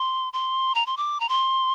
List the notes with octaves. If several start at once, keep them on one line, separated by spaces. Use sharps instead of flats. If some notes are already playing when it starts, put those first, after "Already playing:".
Already playing: C6
C6
A#5
C6
D6
A#5
C6